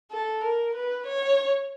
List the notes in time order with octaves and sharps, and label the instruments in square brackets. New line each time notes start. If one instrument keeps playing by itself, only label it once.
[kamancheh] A4
A#4
B4
C#5